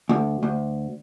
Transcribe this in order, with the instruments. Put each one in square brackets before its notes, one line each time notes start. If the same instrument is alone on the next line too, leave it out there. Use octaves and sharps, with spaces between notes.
[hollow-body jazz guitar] D2
D2